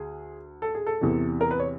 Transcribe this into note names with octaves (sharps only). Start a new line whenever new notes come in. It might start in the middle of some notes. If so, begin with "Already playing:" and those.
Already playing: D2 G#4
A4
G#4
A4
E2 C3 E3
A#4
B4
C#5